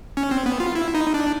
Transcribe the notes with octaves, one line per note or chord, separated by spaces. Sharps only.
C#4
C4
B3
F4
E4
D#4
D4